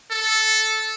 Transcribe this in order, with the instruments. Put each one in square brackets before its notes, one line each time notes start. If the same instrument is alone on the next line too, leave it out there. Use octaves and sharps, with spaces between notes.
[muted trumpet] A4